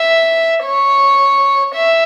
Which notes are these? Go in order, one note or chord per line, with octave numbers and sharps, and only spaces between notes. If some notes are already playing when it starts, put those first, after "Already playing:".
Already playing: E5
C#5
E5